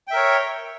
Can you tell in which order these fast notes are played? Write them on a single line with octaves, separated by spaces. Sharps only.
G5 E5 A#4 C#5